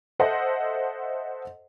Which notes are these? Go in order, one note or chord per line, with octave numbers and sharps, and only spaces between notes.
A4 C5 D#5 E5 F#5 A5